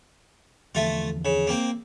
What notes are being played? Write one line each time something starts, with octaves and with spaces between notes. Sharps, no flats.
E2 D3 F3 A3 F4
C#3
A#3 C4